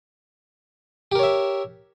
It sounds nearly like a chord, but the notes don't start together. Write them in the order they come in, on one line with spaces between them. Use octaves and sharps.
G4 A#4 C#5 E5